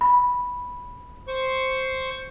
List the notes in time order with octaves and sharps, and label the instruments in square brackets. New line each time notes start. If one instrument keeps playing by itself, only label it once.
[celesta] B5
[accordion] C5 C#6